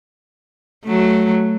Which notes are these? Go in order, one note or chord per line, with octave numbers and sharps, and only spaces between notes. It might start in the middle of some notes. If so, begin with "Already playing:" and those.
F#3 A3